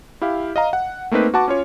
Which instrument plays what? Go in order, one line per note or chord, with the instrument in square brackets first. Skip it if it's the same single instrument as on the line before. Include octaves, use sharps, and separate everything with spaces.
[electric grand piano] E4 G4 F5
D#5 F5 A#5
F#5
A3 A#3 C4 D#4 B4
F#4 B4 F#5 A5 D6
C#4 F4 C#5